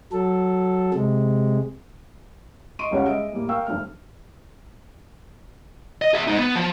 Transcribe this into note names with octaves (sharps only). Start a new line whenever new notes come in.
F#3 A4
C3 G#3
D#5 C6 C#6 D7 D#7
C#2 G3 C#4 C#5 F#5
G#3 D#5 E5 D7
A2 G3 A#3
A#4 F5 G5 C#6 E6
F1 G2 A3 F6
D#5
G#4 E5
G#3 D#4
B3
F3